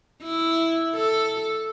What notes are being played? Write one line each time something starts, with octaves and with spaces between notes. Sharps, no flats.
E4
A4